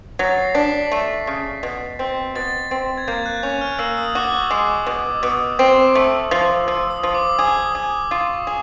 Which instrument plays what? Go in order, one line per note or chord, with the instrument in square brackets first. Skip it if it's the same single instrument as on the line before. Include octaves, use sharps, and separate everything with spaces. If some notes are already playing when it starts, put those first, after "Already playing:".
[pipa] F#3 [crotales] A6
[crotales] C7
[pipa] D4 [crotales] B6
[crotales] B6
[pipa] A3
C#3
B2
C4
[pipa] B2 [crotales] A6
[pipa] C4
[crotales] G#6
[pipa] A#3 [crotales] G6
[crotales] F#6
[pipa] C#4 [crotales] G6
[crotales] F6
[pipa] A#3 [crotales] E6
[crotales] D#6
[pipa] F#4 [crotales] D6
[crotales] C#6
[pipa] G#3 [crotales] D6
[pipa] B2
[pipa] B2 [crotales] D#6
[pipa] C4
[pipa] A3 [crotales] E6
[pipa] F3
[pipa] F3 [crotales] E6
[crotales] D#6
[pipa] F3
[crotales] D6
[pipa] G#4 [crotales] D6
[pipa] G#4
[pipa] F4 [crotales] C#6
[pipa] G#4